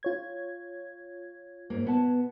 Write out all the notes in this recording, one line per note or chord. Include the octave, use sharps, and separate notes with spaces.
F4 C#5 G#6
F2 G#2 A#3
B2 B3 A5